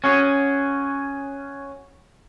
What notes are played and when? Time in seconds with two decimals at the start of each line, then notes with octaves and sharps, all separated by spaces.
0.04 C#4 F#4 G#4